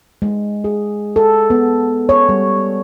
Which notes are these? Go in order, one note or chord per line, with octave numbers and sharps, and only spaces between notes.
G#3
G#4
A4
B3
C#5
G3